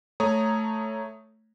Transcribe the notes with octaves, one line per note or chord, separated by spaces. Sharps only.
A3 C#5 A#5 D#6